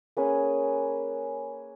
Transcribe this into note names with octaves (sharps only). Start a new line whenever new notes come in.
A#3 C#4 G#4 B4